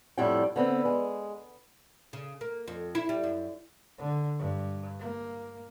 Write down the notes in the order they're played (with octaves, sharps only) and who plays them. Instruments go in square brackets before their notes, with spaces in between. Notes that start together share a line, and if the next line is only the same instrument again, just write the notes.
[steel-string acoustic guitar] F2 A2 G3 E4 F#5 G5
D3 B3 C4
G#3
[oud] C#3
A#3
F2
E4
G3
F#2
[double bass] D3
G2
A#3